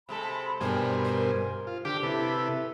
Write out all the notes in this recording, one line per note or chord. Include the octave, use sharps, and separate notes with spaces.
C3 G#3 A4 B5
G2 B2 G3 C4 A#4 C5 G#5
C5
F4
D3 G4 G5 D6
C3 E4 A4 B4